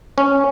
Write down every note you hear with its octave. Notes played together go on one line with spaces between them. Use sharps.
C#4